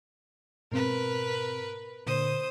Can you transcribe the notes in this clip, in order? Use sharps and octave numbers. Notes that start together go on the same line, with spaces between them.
G#2 B2 C4 A#4 B4
A#2 D3 C5 D#6